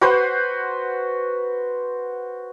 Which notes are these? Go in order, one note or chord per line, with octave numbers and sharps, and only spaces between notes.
F#4 B4 C5 F#5